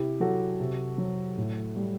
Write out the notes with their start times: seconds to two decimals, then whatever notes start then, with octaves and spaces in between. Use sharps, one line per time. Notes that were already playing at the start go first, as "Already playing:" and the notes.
Already playing: C3 E4 G4
0.20 F#3 F#4 A4
0.60 C3
0.98 F#3
1.37 A2
1.77 G3